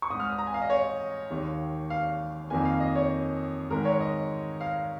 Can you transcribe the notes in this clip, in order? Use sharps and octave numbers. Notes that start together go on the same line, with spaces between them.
C#6
G#2 G#3 D#6
F6
D#6
A#5
G#5
F5
D#5
C#5
D#2 D#3 A#3
F5
F2 D#3 A#3 G#5
F5
D#5
C#5
G#2 D#3 G#3 A#4
C#5
D#5
F5